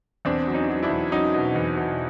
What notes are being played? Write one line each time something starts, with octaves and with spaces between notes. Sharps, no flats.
E2 C4 D4
F#3
C#4 D#4
F#3
D4 E4
E2
F#3 C#4 D#4
B2
E2
B2